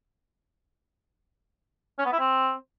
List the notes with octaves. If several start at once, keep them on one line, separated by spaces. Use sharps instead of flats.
C#4
B3
E4
C4